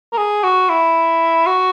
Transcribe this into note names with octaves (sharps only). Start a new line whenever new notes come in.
A#4
G#4
F#4
E4
F#4